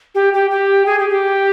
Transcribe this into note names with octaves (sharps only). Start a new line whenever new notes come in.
G4
G4
G4
G#4
G4
G4